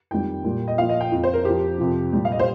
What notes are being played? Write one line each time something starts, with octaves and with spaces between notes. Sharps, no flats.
F2 D#3 G3 G5
A#2 G3
D#5
A#2 F3 F5
D#5
G5
F2 F3
C5
A#4
F2 F3 G4
F2 C3 F3
A#2 G3
F5
D#5
C5